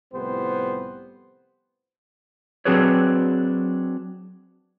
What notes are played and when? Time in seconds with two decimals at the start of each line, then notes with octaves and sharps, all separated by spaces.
0.13 C2 A2 F3 B3 G4 C5
2.65 F#3 C4 D4 G#4 B4 C#5